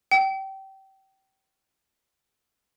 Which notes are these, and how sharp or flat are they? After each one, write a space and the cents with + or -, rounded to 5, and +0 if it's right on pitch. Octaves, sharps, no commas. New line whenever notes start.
G5 -25